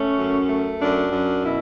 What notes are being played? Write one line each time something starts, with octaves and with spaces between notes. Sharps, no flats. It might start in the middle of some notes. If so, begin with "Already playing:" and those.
Already playing: A3 C#4
F#2
A3
F#2 D4
F#2
B2 E4